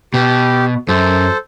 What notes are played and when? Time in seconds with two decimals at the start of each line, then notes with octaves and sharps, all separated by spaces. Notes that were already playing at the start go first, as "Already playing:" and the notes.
0.14 B2 G4
0.88 F#2 A4 C5